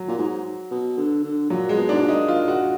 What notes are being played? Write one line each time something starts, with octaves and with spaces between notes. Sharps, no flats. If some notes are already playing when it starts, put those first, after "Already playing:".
Already playing: F#3
A#2
G#2
B2
D3
D3
A#2 F#3
G#3
B2
G#2 D4
A#2
D#4
F4
F#4